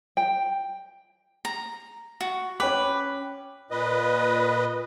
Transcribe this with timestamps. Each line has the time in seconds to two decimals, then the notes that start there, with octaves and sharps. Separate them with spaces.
0.17 G5
1.45 A#5
2.21 F#4
2.60 C#4 B4 G5 D6
3.71 A#2 B4 D#5